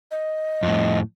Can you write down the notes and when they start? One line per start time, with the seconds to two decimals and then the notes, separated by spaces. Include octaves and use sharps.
0.11 D#5
0.63 F2 A2